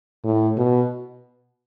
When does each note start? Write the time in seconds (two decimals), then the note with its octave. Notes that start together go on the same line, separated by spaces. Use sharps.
0.24 A2
0.57 B2